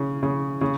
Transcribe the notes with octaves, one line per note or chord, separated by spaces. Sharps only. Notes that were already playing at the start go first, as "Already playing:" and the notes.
Already playing: C#3
C#3
C#3